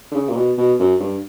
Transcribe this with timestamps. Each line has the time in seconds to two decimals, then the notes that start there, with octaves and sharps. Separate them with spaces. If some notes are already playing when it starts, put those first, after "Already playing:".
0.11 D3
0.15 C#3
0.29 A#2
0.36 B2
0.58 B2
0.79 F#2
1.00 G2